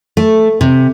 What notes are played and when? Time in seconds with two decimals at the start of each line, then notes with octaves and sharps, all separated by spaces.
0.17 A3
0.61 C3